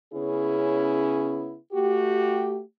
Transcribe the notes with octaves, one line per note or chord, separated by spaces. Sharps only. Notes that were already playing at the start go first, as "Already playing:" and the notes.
C#3 B3 C#4 E4 G#4
A3 F#4 G4